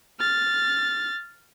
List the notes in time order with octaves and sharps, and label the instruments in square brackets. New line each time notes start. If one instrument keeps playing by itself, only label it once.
[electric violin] F6 A6